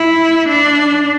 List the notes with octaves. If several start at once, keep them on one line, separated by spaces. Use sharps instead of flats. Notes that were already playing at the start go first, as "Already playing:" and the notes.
Already playing: E4
D4